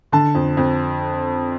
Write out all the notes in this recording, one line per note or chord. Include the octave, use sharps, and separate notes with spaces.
D3 A5
F2
F2